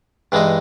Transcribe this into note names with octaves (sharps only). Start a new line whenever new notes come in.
G2 E3 G#3 D#4